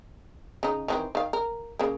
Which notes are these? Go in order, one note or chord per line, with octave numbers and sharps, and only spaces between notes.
C#3 D#4
D#3 E3 C4
D#3 F5
A#4
C#3 A#3